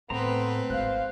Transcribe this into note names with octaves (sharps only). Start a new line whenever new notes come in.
A2 A3 B3 C4 B4 C5 A#5
G#1 C5 F5 F#6